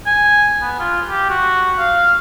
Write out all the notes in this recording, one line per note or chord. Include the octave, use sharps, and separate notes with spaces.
G#5
B3
F4
G4
F#4
F5